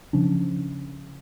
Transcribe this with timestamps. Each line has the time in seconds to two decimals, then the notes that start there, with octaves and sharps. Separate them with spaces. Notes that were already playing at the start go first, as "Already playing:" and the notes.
0.13 C#3 F3 C#4 D4